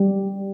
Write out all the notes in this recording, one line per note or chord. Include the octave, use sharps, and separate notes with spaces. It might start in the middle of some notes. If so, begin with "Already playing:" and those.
Already playing: G3 G4